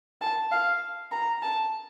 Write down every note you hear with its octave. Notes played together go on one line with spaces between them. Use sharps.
A5
F5
A#5
A5